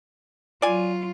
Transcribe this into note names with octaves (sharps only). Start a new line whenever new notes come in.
F#3 F4 D5 G#5